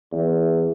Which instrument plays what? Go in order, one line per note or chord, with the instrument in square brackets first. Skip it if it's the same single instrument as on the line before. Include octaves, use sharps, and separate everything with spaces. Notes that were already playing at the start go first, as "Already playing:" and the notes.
[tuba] E2